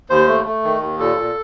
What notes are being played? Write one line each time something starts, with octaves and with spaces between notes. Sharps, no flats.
D#2 C5
A3
A3
D#3
D#2
A#2 A4
A#2